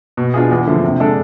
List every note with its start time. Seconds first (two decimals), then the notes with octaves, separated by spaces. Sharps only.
0.17 B2
0.34 B3 D4 F4 G#4
0.51 E2
0.67 D3 F3 A3
0.84 C3
1.00 G#3 D4 A4